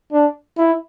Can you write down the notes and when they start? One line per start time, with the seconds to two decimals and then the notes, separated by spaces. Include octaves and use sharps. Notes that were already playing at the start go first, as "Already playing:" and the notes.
0.13 D4
0.58 E4